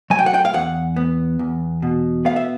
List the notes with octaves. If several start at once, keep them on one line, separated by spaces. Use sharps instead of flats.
F#3 G#5
G5
F#5
G5
F5
E2 F#5
B3
E2
B2
B3 F5
E5